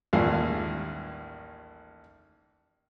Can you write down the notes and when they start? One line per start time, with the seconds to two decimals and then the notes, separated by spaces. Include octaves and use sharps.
0.13 A1 D#2 G3 G#3 F4 F5